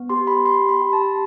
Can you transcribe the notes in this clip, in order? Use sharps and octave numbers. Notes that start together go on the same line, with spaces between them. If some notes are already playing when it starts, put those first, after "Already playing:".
Already playing: B3
G4 C6
B5
G4 C6
B5
G4
A5